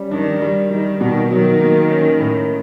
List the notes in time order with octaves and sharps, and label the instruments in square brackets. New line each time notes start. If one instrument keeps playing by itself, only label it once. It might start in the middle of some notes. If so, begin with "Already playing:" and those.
Already playing: [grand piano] G3 C#4
[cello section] D#3 [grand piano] D4
[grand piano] G3
[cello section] D#3 [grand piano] G3
[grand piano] B2 [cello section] D#3
[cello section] D#3 [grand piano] F#3
[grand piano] A#3
C#4
A2